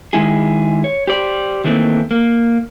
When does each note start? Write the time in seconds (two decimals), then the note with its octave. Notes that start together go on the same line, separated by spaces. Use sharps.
0.13 D#3 G#3 E4 G#4
0.84 C#5
1.07 G4 C5 D5
1.64 D#3 E3 A3 A#3 C4
2.11 A#3